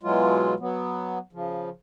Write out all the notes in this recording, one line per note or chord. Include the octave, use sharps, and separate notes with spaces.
B2 E3 F#3 G#3 F4
F#3 B3
C#3 F3